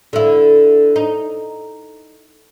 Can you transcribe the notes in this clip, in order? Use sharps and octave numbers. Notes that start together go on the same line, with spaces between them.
D3 E4
D#4